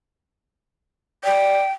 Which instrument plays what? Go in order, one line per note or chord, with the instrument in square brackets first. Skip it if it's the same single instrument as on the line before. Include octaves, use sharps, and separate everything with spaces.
[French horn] D5 [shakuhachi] G5